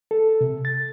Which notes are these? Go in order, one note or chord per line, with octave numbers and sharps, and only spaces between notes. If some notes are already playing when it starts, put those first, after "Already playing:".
A4
C3
A6